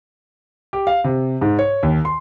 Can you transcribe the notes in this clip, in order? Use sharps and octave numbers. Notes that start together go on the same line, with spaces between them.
G4
F5
C3
G#2
C#5
D#2
C6